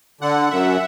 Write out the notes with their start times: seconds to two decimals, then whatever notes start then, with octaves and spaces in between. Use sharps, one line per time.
0.21 D3 F#5
0.51 F#2 E5